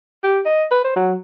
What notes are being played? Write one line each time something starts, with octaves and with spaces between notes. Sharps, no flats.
G4
D#5
B4
C5
F#3